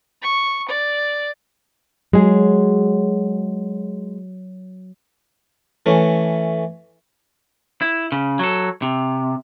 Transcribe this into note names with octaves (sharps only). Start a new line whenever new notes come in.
C#6
D5
F#3 G#3 G#4
E3 A3 C#4
E4
C#3
F#3 A4
C3